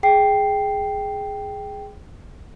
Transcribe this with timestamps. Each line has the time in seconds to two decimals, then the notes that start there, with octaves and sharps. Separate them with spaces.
0.03 G#4 G5 C7